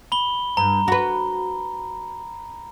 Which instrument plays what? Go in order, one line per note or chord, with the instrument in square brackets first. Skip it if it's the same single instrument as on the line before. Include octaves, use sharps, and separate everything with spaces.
[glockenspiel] B5 G7
[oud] G2 [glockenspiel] A#5
[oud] F#4 B4